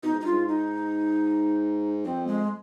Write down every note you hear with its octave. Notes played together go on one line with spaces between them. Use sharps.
B2 D#4
G#2
G2 D#4
F4
G#2
D#4
F2 C4
G#3